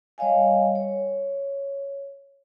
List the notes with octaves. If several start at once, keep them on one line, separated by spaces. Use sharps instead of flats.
G3 C#5 D#5 F5 G#5
C#5